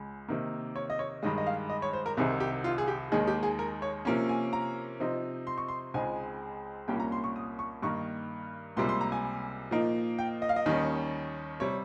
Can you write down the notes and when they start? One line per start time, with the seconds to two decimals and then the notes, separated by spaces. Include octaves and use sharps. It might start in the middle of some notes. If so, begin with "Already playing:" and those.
Already playing: C#2 C#3 G#3
0.28 C3 D#3 A#3
0.76 C#5
0.90 D#5
0.99 C#5
1.23 G2 D#3 G#3 D#5
1.38 D#5
1.47 F5
1.70 D#5
1.82 C#5
1.93 C5
2.06 A#4
2.17 C2 C3 D#3 G#4
2.40 G4
2.64 F4
2.78 G#4
2.88 G4
3.12 D#2 D#3 G#3 D#4 G#4
3.27 G4
3.43 G#4
3.59 A#4
3.82 C#5
4.05 C3 F3 A#3 C#4
4.29 G#5
4.53 A#5
5.00 C3 F3 C4 D#4
5.47 C6
5.58 C#6
5.68 C6
5.94 C#2 C#3 G#3 C4 D#4 G#5
6.88 C2 A#2 G3 A#3 C#4 G5
7.00 A#5
7.12 C6
7.24 C#6
7.36 D#6
7.59 C#6
7.82 G2 D#3 A#3 C#6
8.77 C#2 C3 G3 A#3 C6
8.89 C6
9.01 A#5
9.12 G#5
9.71 A#2 F3 A#3 D#4
10.19 G5
10.42 D#5
10.49 F5
10.56 D#5
10.66 D#2 D#3 G3 C#4
11.60 C3 G3 C#5